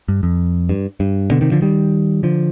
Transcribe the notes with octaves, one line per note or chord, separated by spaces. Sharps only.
G2
F2
G2
G2
B2 D3
C3 D#3
D3 F3
D#3 G3
D3 F3